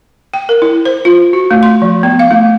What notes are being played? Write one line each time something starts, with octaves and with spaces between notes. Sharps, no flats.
G5
A#4
E4
C5
F4
F#4
A3
C6
F3
B3
F5
A3